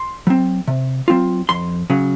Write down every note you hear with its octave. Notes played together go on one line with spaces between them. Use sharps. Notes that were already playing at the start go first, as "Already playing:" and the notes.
Already playing: C6
F#3 C4
C3
F#3 C4 F4
F2 C6
C#3 F#3